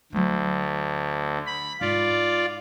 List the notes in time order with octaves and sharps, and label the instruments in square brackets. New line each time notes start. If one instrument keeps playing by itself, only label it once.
[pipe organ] D2 [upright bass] F#3 A3
[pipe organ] B5
[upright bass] G#2 [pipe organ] F4 D5